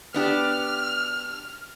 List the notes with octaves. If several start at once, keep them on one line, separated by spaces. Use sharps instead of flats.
B3 D4 G4 F6